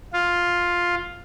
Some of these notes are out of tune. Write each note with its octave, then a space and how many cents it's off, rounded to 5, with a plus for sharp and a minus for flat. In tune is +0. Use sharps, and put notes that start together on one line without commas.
F4 +5